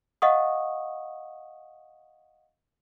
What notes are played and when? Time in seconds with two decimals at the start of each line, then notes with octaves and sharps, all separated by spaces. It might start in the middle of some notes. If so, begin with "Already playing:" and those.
0.22 D#5 F5 F#5 C#6 D#6